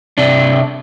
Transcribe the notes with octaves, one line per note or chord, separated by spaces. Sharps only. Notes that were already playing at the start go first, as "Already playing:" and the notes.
C3 D4